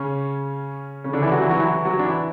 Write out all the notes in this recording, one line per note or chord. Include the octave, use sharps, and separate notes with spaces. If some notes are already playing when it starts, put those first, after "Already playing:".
Already playing: C#3 C#4
C#3 C#4
D3 D4
E3 E4
F#3 F#4
E3 E4
F#3 F#4
E3 E4
F#4
F#3 F#4
D4
E3 E4